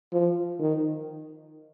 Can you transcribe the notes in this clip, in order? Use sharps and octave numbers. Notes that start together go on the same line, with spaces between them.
F3
D#3